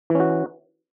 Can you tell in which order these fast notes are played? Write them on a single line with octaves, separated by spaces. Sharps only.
E3 C#4 F#4